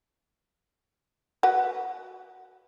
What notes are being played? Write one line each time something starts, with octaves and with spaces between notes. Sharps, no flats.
F#4 B4 F#5